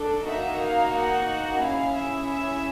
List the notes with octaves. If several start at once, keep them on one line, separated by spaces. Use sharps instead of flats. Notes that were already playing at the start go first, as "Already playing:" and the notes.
Already playing: D4 A4
A#3 D#4 F#4 E5
F5
F#5
C#4 E4 G#4 F5
E5
E5